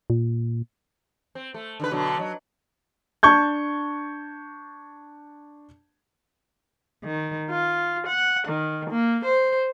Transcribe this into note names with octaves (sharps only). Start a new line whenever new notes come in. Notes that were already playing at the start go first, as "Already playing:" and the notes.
A#2
C4
A3
D3 D#3 B4
B2 D3 F#3
F#3
D4 A5 C#6 G6 G#6
D#3
F4
F#5
D#3
A#3
C5